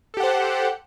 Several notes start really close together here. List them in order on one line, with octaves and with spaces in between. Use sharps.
A4 G4 F#5 C5